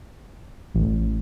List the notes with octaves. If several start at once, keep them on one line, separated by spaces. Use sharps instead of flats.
A1